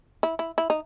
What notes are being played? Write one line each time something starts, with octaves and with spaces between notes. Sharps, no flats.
E4
E4
E4
D#4